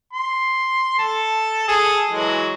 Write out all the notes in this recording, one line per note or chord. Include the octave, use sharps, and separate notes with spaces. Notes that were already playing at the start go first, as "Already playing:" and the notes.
C6
A4 A5
G#4 A4
E3 F#3 G#3